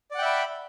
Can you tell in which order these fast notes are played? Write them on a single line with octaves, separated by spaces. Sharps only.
D5 F#5 G5 E5 B5